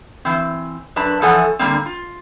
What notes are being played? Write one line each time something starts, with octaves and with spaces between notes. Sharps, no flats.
E3 C4
F#2 D4 B4 A5
E3 F3 A4 C#5 F#5 G#5
D3 G3 A#3 C4
F4